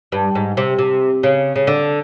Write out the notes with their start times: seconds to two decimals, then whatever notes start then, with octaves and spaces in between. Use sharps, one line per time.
0.12 G2
0.35 G#2
0.57 C3
0.79 C3
1.23 C#3
1.56 C#3
1.67 D3